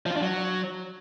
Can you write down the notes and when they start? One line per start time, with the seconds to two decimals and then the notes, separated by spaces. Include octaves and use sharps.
0.06 F3
0.11 F4
0.16 D4
0.22 F#3